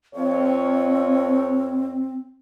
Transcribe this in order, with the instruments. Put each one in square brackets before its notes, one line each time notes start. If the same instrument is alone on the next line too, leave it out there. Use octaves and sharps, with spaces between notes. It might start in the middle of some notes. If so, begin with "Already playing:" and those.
[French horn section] F2 C#5 [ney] C4